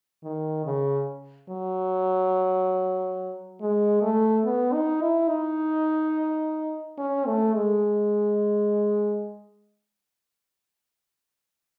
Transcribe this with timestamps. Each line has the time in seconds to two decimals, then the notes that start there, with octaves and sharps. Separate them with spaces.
0.24 D#3
0.65 C#3
1.49 F#3
3.61 G#3
4.02 A3
4.45 B3
4.73 D#4
5.01 E4
5.29 D#4
6.98 C#4
7.26 A3
7.54 G#3